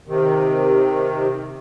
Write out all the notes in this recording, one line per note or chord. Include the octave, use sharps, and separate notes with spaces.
C3 D#3